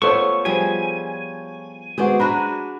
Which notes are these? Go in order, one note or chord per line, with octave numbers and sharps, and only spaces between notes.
A3 B3 F4 A4 C5 C#5 C#6
F3 G3 G#4 G#5
G#3 B3 F#4 G#4 C5 D5
D4 F#4 A#5 B5